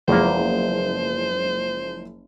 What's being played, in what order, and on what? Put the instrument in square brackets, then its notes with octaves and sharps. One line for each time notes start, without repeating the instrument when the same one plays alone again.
[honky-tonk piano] F#1 F3 G#3 [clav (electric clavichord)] E2 A#3 [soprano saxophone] C5